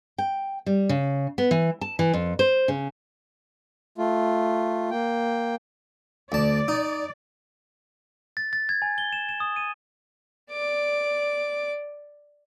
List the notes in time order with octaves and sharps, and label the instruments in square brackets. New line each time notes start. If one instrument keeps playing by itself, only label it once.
[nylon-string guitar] G5
G3
C#3
B3
E3
A5
E3
F2
C5
C#3
[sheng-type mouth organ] A3 F4
A#3 G5
[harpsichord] D2 A5 [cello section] D5
[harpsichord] D#4
[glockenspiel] A6
A6
G#6
G#5
G7
E7
E7
D#6
D#7
[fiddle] D5 D6